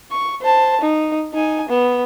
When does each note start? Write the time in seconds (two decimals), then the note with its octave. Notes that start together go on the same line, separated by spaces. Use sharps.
0.11 C#6
0.42 C5 A5
0.81 D#4
1.34 D#4 G#5
1.69 B3